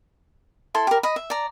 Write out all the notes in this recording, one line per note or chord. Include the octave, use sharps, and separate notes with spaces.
E4 A4 C6
G4 A#4
D#5 B5
E5
D5 A#5